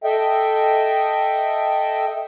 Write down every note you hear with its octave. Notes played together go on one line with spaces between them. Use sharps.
A4 D#5 E5 G5